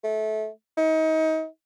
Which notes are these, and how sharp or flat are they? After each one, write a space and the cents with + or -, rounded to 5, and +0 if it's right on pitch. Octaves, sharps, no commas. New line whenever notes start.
A3 -25
D#4 +30